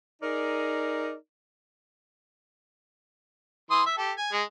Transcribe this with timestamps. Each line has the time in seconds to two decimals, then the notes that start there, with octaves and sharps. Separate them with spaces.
0.22 D#4 G#4 A#4 D5
3.71 E3 C6 D#6
3.86 E5
3.98 G4 A4
4.18 G#5
4.32 G#3